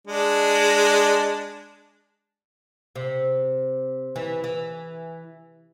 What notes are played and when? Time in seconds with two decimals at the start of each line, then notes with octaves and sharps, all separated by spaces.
0.07 G#3 D4
2.95 C3
4.16 E3
4.44 E3